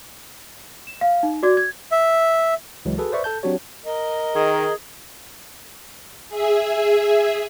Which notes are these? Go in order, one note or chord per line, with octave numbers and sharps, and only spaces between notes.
E7
F5
D#4
F#4 D5 D6 G#6
G#6
E5
C#2 E3 F#3 G#3
F#4 G#4 A4 B4
B4 C5 D5 E5 C#6
A4 A5 G6
F#3 C4 D4 F#4 G4 C#5
A#4 D#5
D#3 G#4
G#4 E5